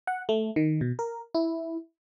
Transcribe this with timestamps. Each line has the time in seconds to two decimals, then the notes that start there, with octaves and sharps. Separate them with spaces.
0.07 F#5
0.29 A3
0.56 D#3
0.81 B2
0.99 A#4
1.35 E4